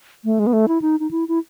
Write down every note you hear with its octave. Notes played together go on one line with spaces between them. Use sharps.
A3
G#3
B3
A3
E4
D#4
D#4
E4
E4